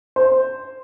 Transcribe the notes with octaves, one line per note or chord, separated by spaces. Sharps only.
C5